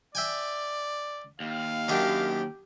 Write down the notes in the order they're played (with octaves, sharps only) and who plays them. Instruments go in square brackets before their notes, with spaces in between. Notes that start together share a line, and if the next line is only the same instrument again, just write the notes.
[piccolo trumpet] D5 [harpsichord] E5 G5 G#5
[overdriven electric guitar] D#2 [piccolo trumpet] F5
[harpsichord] F#2 D#3 D4 [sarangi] G4